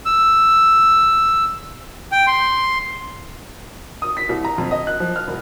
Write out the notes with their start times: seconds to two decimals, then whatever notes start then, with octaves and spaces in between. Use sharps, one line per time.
0.06 E6
2.12 G5
2.27 C6
4.02 D#6
4.17 B6
4.29 C2
4.45 A#5
4.58 F2
4.71 D#5
4.87 F#6
5.00 F3
5.16 F6
5.27 E1